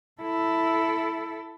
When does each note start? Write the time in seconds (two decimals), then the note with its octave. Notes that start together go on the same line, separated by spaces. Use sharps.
0.22 E4 A4